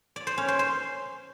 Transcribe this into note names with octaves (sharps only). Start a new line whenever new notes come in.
D5
C5
C#4
C5
C5